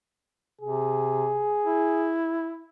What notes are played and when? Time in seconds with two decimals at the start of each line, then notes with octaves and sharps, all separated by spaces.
0.61 C3 G#4
1.64 E4